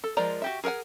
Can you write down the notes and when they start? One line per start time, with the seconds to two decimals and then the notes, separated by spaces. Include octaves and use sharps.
0.04 A4
0.17 F3 G#3 A#4 D5 A#5
0.42 F#4 G4 E5
0.64 G#4 A#4 B4 F#5 G#5